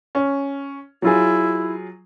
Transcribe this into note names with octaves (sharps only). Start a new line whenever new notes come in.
C#4
F#3 E4 F4 G#4